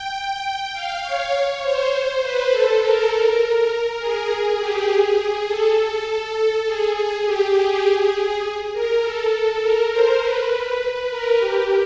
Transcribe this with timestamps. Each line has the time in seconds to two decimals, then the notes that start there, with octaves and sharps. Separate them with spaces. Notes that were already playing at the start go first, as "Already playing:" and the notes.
Already playing: G5
0.44 G5
0.73 F5
1.03 C#5
1.63 C5
2.22 B4
2.51 A4
2.81 A#4
3.40 A#4
3.70 A#4
3.99 G#4
4.29 G#4
4.58 G4
4.88 G#4
5.47 A4
5.77 A4
6.66 G#4
6.96 G#4
7.25 G4
7.55 G#4
7.85 G#4
8.73 A#4
9.03 A4
9.32 A4
9.62 A#4
9.92 C5
10.21 B4
10.81 B4
11.10 A#4
11.40 G4